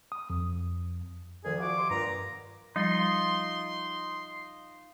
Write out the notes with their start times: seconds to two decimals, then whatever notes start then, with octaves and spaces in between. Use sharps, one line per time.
0.12 D#6
0.30 F2
1.45 D2 D#3 F3 G#4 A#4
1.60 G3 F4 F#4 D6
1.77 G3 D#5 C6
1.90 G2 A#2 B3 A#5
2.76 F3 G3 D#4 F4 C6